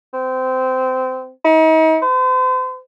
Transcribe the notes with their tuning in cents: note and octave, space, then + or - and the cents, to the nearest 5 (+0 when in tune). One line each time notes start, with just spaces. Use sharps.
C4 -20
D#4 +40
C5 -40